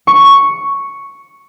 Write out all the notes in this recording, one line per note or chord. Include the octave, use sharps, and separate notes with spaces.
C#6